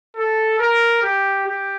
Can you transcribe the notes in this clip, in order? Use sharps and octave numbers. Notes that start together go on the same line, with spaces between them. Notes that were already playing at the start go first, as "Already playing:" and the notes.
A4
A#4
G4
G4